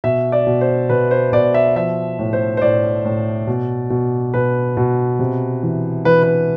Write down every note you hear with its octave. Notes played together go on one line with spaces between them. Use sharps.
B2 E5
D5
B2
C5
B2 B4
C5
B2 D5
E5
F3 E5
A2
C5
C5
A2 D5
A2
B2
B2
B2 B4
B2
C3
E3
E3 B4
B4